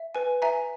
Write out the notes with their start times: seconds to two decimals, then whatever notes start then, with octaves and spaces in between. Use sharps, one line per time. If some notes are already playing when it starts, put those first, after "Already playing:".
Already playing: E5
0.15 B4 G#5
0.42 E5 G#5 A#5